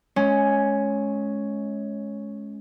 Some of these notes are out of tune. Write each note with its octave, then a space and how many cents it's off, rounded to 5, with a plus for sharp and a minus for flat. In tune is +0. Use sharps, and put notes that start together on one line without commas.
G#3 +30 C#4 +0